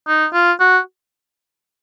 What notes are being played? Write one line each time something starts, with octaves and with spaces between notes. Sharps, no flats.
D#4
F4
F#4